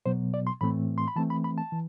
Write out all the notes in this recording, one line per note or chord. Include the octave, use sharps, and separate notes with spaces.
B2 F#3 B3 C5
D5
C6
A2 E3 A3 C4 B5
C6
B5
E3 A3 C4 A5
B5
B5
A5
E3